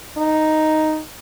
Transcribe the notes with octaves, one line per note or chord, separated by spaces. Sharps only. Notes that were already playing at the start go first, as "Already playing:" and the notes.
D#4